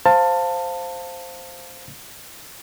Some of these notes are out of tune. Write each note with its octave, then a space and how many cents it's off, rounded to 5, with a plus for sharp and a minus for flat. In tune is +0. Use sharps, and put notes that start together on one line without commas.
C5 +0 F5 +0 A5 +20